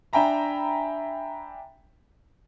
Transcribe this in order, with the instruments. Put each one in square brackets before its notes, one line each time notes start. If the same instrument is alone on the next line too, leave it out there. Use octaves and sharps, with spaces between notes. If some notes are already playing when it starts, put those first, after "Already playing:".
[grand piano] D4 E5 G5 G#5 A#5 B5